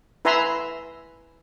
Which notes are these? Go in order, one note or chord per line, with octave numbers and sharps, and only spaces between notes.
E4 B4 E5 G#5 A#5 C6